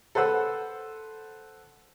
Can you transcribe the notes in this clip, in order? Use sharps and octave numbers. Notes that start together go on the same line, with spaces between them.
A4 B4 C5 F#5 E6